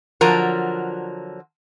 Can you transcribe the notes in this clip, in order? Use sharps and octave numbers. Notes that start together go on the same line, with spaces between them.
D3 F3 F#3 A#4